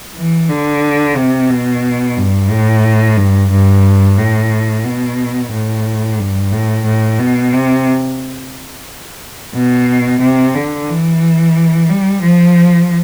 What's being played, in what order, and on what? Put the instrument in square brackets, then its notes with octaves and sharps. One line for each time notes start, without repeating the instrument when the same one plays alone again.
[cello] E3
D3
C3
B2
G2
A2
G2
G2
A2
B2
A2
G2
A2
A2
B2
C3
B2
C3
D3
E3
G3
F3